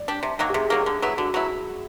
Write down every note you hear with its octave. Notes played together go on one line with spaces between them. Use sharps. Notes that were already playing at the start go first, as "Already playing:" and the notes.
Already playing: D5
D4 G4
C3
D#3 F#3 A#3
G4
C3 G#4
D#3 F#3 A#3
D3
F#3 B3 E4
D3 F#4
F#3 B3 E4